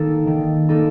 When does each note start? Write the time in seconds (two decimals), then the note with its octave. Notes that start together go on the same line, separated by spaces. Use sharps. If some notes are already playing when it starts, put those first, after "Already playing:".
Already playing: D#3 A#3 D#4 A4
0.27 D#3
0.69 A#3 D#4 A4